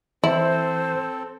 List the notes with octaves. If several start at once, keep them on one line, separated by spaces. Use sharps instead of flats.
E3 C4 E4 A4 C5